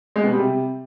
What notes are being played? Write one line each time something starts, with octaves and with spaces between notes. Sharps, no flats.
G#3
B2
G3
C3